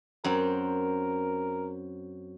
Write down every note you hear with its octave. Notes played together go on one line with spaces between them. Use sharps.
F#2 C4 A#4